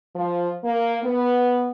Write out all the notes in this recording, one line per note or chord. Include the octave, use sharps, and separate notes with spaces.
F3
A#3
B3